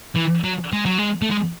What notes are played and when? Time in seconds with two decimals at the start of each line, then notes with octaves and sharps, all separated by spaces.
0.15 E3
0.44 F#3
0.73 G#3
0.86 F#3
0.98 G#3
1.22 A3
1.31 G#3